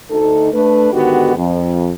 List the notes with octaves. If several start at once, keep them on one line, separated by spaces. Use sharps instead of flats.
D2 D#4 A4
A3 D4 B4
G#2 D3 D#3 B3 F#4 G4
F2